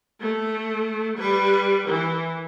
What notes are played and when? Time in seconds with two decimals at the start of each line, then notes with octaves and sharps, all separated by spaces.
0.21 A3
1.18 G3 B4
1.88 E3